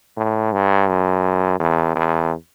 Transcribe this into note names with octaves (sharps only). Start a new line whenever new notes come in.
A2
G2
F#2
E2
E2